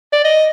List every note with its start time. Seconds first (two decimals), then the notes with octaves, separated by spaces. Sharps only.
0.13 D5
0.24 D#5